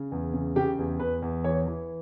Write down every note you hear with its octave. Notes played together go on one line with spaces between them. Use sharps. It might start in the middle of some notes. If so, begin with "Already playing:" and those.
Already playing: C#3
E2
C#3
C#3 G4
E2
E2 B4
E2
E3 C#5
E3